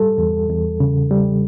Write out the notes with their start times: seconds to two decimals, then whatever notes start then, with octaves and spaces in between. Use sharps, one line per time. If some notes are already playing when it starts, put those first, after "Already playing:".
Already playing: G3 A4
0.18 E2
0.49 E2
0.80 C#3
1.11 G3